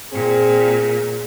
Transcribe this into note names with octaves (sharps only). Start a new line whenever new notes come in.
A#2 C4 G#4